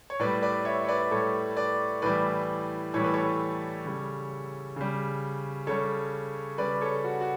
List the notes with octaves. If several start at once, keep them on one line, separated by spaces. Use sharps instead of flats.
C#5
A2 G3 B4 D5
B4 D5
C#5 E5
C#5
B4 D5
A2 G3 A4 C#5
B4 D5
A2 E3 G3 B4 D5
A2 E3 G3 C#5
B4
A4 C#5
C#3 G3
C#3 G3
C#3 G3 A4 C#5
C#3 G3 B4 D5
A4 C#5
F#4
F#4